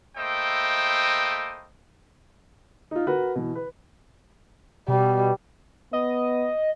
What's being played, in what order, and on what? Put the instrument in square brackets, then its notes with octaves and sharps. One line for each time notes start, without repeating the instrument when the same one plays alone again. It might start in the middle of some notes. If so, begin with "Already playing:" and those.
[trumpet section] A3 A#3 E4 C5 D#5 G5
[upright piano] D#4 F4
F#4 A#4 B4
B2 E3
B4
[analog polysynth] B2 [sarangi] G3
[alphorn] B3 [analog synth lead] D#5